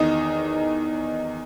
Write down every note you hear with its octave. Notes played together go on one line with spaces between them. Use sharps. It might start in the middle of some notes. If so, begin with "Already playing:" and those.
Already playing: E2 D#3 D#4 D#5